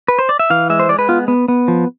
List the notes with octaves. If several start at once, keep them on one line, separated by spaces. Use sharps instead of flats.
B4
C5
D5
E5
E3 F5
G#3 E5
C5
G#3 D5
B4
B3 F4
B3
B3
F3